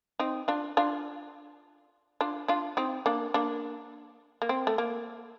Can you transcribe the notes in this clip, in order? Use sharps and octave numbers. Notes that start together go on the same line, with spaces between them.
C4 D#4
D4 F4
D4 F4
D4 F4
D4 F4
C4 D#4
A#3 D4
A#3 D4
A#3
C4
A3
A#3